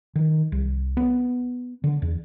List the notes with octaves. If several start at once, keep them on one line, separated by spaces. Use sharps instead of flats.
D#3
C2
B3
D3
E2